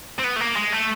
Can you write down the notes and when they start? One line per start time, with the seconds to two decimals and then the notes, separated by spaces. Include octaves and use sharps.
0.19 C4
0.24 B3
0.36 A3
0.40 A#3
0.56 G#3
0.72 A3